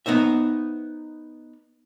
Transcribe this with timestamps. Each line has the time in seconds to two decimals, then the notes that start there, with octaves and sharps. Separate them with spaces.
0.06 B3 D#4 C5 E5